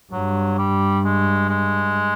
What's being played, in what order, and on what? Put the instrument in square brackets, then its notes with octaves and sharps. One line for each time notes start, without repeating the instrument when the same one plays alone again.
[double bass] G2 [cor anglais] F#3
[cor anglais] G3
G#3
G#3